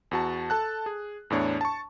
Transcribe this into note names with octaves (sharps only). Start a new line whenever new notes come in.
E2 F#4 A5
A4 A5 F#6
G#4
E2 A2 D4 C#5
A5 C#6